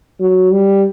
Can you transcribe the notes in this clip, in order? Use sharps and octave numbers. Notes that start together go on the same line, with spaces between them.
F#3
G3